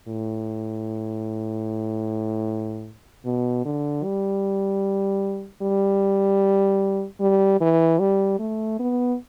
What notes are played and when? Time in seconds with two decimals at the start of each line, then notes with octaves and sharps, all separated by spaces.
0.08 A2
3.25 B2
3.65 D3
4.04 G3
5.62 G3
7.20 G3
7.61 E3
7.99 G3
8.39 A3
8.79 B3